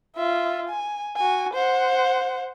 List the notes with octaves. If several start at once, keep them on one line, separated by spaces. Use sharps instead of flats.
F4 E5
G#5
F#4 G#5
C5 F#5